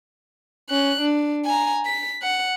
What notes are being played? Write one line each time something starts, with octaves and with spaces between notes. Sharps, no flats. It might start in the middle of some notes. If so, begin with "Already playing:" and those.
C#4 F#6
D4
G#5 A#5
B6
F#5